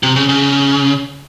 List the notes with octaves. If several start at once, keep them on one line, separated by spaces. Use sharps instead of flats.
C3
C#3
C#3